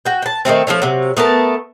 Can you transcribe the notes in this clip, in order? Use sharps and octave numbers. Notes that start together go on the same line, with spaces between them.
F#4 G5
G5 A5
D#3 F3 A3 C4
F3 F#3 A3 C#4
C3 F#3
A3 B3 A#4 A5